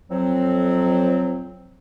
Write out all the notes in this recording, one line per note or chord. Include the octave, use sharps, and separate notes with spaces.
F2 F#3 C4